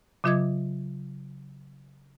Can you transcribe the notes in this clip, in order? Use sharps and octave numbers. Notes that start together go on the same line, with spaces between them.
C#3 F#3 F4 D#5 D6 G#6